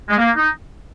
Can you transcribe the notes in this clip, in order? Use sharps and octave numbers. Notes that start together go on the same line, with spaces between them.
G#3
A#3
D#4